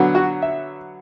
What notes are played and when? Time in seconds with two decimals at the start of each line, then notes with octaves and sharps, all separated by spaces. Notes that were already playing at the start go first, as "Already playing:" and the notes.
Already playing: D3 F#3 B3
0.15 F#4
0.42 E5